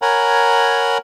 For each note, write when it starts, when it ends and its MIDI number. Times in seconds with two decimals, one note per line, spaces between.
0.02 0.98 70
0.02 0.98 73
0.02 0.98 78
0.02 0.98 80
0.02 0.98 82
0.02 0.98 83